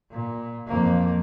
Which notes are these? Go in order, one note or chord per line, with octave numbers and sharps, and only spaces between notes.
A#2
F2 A#3